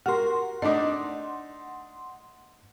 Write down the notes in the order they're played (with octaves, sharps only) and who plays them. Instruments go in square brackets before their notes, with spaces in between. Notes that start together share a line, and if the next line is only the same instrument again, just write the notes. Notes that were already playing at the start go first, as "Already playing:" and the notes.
[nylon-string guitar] F#4 A#4 [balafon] G4 [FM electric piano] F#5 C6
[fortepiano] A3 D4 D#4 [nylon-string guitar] D5 [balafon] D#5 D6